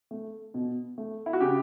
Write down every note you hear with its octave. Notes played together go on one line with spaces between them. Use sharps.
A3
B2
A3
E4
F#4
C#3 G4